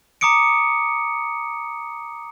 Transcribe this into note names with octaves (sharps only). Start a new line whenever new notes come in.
A#5 D6 D#6 C#7 D7